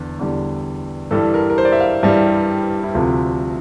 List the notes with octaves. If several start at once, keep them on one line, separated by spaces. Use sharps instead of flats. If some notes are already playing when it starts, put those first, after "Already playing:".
Already playing: E2 D3
E2 D3 G3
G2 E3 G3 A4
A#4
A#4
C5
D5
E5
F5
G2 E3 G3 E5
E4
D2 C3 F3 A3 F4